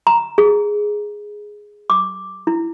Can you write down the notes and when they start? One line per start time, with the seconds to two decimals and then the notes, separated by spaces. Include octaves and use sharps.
0.07 A#5
0.38 G#4
1.90 D6
2.47 E4